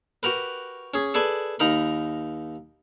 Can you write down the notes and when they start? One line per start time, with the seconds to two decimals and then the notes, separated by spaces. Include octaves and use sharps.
0.23 F#4 G4 A#4 B4
0.94 C#4 G#4
1.14 G#4 A4 B4 D5 G#5
1.60 D#2 D#4 A#4 B5